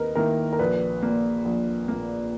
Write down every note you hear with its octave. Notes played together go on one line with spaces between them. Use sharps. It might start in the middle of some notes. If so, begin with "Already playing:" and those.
Already playing: D#2 D#3 A#3 A#4 B4 D#5
D#3 A#3 E4 A#4
A#4
A#1 B4
A#2 A#3
A#1
A#2 A#3